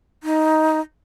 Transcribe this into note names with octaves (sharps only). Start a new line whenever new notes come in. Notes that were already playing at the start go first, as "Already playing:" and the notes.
D#4